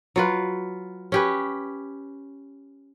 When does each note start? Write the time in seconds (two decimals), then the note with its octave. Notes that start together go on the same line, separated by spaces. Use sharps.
0.16 F#3 F4 B4
1.12 C#4 G4 B4